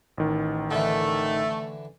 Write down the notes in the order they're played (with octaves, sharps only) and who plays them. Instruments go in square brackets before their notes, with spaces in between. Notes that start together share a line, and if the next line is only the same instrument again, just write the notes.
[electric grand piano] A1 D#3
[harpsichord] D3 E3 [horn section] A3